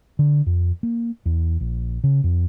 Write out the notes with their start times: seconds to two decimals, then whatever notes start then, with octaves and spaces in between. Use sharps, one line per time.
0.19 D3
0.46 F2
0.83 A#3
1.26 E2
1.60 A#1
2.04 C#3
2.24 F2